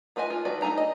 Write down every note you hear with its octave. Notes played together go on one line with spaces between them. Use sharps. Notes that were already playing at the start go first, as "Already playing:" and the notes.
A3 F4 B4 D#5 G#5
F4 A#4
D#3 A3 F#4 B4 D5
A3 D#4 G#4 G#5 A#5
D#5